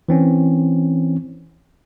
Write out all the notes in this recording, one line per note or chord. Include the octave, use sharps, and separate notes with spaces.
E3 C4 C#4